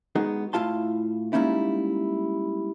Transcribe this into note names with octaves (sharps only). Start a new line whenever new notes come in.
G#3 B3 D#4 F#4 G#4
A2 E4 F4 F5 A5 C6
G3 G#3 A#3 C#4 D#4 E4